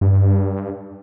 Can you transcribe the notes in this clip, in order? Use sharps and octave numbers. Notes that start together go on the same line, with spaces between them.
G2